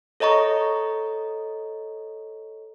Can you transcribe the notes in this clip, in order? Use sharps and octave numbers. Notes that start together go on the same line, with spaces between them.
A4 C#5 D#5 A#5 C#6